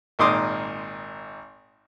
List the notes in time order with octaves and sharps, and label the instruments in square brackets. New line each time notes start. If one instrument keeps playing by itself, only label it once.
[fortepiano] G#1 A#2 D#4 C6 D6 D#6